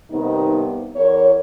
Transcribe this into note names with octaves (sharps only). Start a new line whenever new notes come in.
G2 C3 D#3 B3 D#4
E2 A#4 C#5